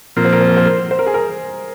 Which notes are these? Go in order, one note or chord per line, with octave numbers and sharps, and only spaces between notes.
A#2 F3 C4 A#4
C5
A#4
C5
A#4
C5
A#4
C5
A#4
G#4
A#4